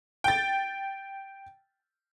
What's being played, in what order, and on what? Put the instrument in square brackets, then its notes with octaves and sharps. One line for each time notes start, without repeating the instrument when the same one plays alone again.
[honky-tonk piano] G5 A6